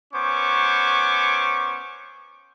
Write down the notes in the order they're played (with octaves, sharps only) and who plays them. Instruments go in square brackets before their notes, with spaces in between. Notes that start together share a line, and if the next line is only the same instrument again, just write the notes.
[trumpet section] B3 C#4 C5 C#6 D6